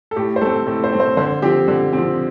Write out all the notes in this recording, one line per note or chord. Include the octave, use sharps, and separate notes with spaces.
A4
A2 G4
C5
A3 C4 A4
A2 A4
C5
A3 C4
C5
D3 C5
F3 C4 G4
D3
F3 C4